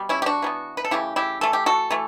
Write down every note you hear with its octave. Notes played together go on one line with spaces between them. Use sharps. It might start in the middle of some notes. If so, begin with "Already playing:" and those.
Already playing: B2 G3
C#4 E4
G4
D4 F#4
E3 G3 B3
B4
A4
C#3 E3 A3 E4 G4
E4 G4
E3 A3 A4
G4
F#4 A4
E3 A3